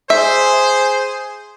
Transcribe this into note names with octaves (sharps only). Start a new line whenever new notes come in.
G#4 C5 E5